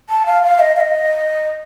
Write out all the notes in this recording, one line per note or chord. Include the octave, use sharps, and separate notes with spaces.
A5
F5
F5
D#5
F5
D#5